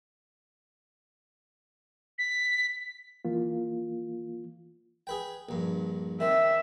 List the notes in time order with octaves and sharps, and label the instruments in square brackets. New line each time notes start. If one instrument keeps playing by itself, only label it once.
[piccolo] B6
[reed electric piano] E3 A#3 F4
[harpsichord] G#4 B4 G5
A#1 G2
[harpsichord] D#3 C4 [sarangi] E5